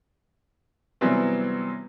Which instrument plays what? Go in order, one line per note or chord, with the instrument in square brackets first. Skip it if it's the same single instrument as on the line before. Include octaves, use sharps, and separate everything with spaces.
[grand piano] C3 E3 F#3 G3 B3 C4